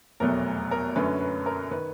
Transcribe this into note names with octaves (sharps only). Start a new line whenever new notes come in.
F1 E2 B2 F#3 A3 A#4
A#4
F#2 D3 F#3 A3 C#4 B4
B4
A#4
D#3 B4